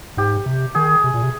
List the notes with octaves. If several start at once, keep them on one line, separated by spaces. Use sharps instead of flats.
G#2 G4
C3
D#3 G#4
C3
A#2
C3